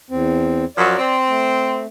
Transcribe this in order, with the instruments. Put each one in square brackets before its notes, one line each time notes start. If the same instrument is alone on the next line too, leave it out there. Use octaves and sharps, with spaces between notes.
[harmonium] E2 C4
[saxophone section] F#2 F3 F#3 [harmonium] D5
[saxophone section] C4
[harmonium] A3